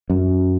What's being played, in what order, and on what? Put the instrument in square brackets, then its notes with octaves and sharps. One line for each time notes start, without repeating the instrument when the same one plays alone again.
[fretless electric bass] F#2